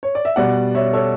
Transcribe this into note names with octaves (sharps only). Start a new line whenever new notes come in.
C#5
D5
E5
B2 G3 D5 F#5
C#5 E5
A4 C#5